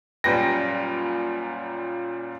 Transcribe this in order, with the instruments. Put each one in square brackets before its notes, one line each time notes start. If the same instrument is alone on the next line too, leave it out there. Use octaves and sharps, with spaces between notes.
[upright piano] F#2 A#2 G3 B4 G5 A#6